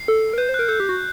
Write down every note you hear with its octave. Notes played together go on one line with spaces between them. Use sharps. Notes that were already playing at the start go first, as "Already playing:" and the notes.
Already playing: C7
A4
A#4
B4 G6
C5
A#4 F#6
A4 G6
G4
F#4